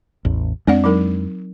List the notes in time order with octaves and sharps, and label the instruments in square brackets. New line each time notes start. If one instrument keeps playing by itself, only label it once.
[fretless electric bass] A1 E2
[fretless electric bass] F2 G#3 D4 [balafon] C4 D5 F#5
[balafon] F#3 D#4 A#4